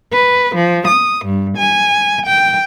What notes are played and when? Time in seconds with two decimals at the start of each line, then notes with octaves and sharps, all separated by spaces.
0.13 B4
0.54 F3
0.86 D#6
1.25 G2
1.56 G#5
2.25 G5